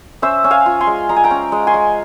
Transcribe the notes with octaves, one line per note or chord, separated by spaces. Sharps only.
C#4 C5 E5
C#4
F5 G#5
F4
G#5 C6
G#3
G#3 A#5
G#5
G5 A#5
C#4
G#3
G#5 C6
G#3